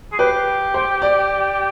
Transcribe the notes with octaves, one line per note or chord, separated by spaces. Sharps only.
G#4
G4 B4
C5
D5